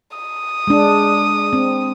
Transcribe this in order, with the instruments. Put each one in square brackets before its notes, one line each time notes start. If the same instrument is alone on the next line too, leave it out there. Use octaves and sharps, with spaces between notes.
[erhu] D#6
[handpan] G#3 D4
C4